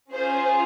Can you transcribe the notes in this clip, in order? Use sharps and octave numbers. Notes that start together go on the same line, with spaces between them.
C#4 F4 G#4 C5